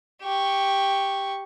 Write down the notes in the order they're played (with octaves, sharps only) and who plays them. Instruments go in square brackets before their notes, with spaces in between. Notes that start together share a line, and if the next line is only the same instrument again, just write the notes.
[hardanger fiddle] G4 C#6